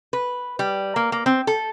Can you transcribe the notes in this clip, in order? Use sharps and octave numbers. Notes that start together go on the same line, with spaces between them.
B4
G3
A#3
A#3
C4
A4